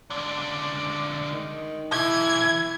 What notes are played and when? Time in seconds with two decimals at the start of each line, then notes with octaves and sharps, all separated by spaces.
0.10 D3 G#3 D5
1.33 D#3
1.92 B1 E3 E4 G#6